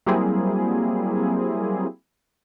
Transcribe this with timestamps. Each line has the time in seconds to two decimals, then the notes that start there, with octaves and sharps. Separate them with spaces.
0.06 F#3 G3 A#3 C4 E4 G#4